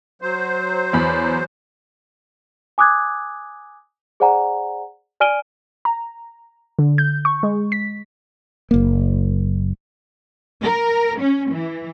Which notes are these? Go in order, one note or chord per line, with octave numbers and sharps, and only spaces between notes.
F#3 C5
E2 B5
G#5 D6 D#6 F#6 G#6
G#4 C5 D5 F#5 G#5 A#5
D5 G#5 F6 D7 D#7 G7
A#5
D3
G6
C#6
G#3
B6
F#1 A#3
A#4
C#4
E3